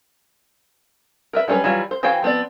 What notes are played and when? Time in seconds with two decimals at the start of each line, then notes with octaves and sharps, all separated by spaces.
1.33 A#4 B4 E5
1.48 F#3 G3 C#4 G#4 B4
1.64 E3 F#3 G3 F4
1.91 C5
2.03 E3 F#4 C5 F5 G5
2.22 F3 B3 C4 D5